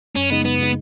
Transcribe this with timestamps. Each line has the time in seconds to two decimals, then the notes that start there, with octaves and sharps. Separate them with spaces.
0.16 F#2 C#4
0.30 C#3 G#3 B3 D#4
0.45 F#2 B3
0.59 C#3 G#3 D#4